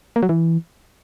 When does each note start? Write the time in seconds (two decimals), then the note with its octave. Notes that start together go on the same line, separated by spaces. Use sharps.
0.16 A#3
0.23 F#3
0.29 E3